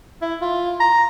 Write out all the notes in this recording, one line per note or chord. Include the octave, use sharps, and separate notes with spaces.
E4
F4
A#5